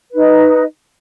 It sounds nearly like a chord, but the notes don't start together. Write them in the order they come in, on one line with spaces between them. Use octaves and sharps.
B4 D#4 D#5